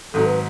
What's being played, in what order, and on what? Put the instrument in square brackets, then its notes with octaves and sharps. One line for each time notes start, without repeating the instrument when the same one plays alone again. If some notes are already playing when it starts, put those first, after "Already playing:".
[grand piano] G#1 G#2 F#3 [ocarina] A4
[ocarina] B4